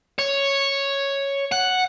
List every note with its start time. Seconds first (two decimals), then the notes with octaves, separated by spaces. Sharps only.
0.19 C#5
1.52 F#5